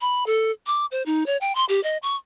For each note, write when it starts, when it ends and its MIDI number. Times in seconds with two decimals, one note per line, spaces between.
0.01 0.24 83
0.26 0.51 69
0.66 0.86 86
0.91 1.03 72
1.06 1.26 63
1.26 1.37 73
1.41 1.53 79
1.55 1.65 84
1.69 1.82 67
1.83 1.97 75
2.03 2.16 85